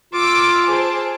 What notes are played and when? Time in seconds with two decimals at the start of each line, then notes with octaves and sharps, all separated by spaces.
0.13 F4 D6 E6
0.66 G#4 C5 A5